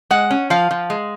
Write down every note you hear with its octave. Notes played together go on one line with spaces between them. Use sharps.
G#3 F#5
C#4
F3 F5
F3
G#3